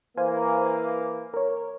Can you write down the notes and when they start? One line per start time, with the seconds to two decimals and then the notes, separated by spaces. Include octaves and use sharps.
0.17 E3 A#3 C5 F5 G#5
1.34 A#4 C#5